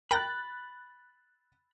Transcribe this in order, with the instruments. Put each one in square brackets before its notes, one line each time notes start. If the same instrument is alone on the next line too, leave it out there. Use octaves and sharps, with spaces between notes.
[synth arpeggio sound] A#4 G5 A#6 [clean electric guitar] B5 [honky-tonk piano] F#6 A6 F#7